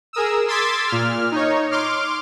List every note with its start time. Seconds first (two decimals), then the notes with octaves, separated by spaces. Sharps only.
0.13 G#4 A#4 D#6 E6
0.48 C6 D6 E6 G#6 A6 B6
0.87 A#2 F6
1.32 D#4 C#5
1.71 C6 D6 F6